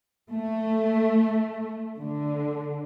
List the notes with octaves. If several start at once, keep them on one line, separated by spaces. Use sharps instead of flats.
A3
D3